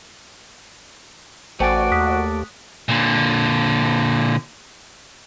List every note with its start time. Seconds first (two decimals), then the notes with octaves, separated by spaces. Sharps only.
1.60 A1 A3 F#4 C5 D5 G5 G#5
1.92 D#2 D#6 F#6 B6
2.89 A#2 D3